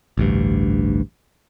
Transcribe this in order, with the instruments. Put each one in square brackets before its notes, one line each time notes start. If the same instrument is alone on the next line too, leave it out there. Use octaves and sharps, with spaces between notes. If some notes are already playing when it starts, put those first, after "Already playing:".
[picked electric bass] A1 D2 G2